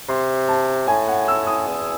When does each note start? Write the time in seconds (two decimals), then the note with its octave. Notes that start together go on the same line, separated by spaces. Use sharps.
0.09 C3 C6
0.48 A5
0.87 A2 G#5
1.08 F#5
1.28 E6
1.47 D#6
1.67 E2